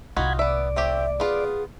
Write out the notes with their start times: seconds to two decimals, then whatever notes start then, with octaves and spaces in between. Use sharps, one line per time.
0.17 C2 A2 D#4 F4 F#4 F#5 B5 G#6
0.39 B3 D5 E5
0.76 A3 C4 G4 E5
1.20 B3 F4 G#4